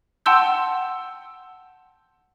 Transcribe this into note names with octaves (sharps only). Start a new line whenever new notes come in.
F#5 G5 A5 C6 E6 G6